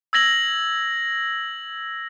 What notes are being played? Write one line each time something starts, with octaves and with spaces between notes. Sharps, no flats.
E6 G#6 A#6 F#7